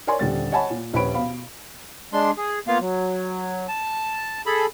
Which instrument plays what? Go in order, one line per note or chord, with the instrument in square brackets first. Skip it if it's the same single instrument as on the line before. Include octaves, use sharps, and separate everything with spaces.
[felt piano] A#4 C#5 D5 G#5 C6
D#1 D3 G3 A6
C#5 D#5 F#5 G#5 A5 B5
A#2
D#1 A#1 B4 C#5 B5 D7
B2 F5 B5
[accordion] G#3 D4 C6
G#4
A#3 B3 F4 F5
F#3
A5
G#4 A4 B5